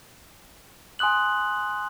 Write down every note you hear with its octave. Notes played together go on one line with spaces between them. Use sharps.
G#5 C6 D#6 F#6 F#7